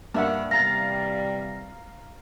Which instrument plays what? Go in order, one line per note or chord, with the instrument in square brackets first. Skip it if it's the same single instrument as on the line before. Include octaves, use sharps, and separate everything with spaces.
[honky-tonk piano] G2 [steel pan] A#3 E5 F#5
[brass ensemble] C3 E3 G3 [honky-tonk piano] F5 A#5 A6 [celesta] A#6